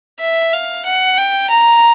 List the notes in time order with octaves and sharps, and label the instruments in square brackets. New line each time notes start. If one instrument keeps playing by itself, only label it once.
[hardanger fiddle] E5
F5
F#5
G5
A#5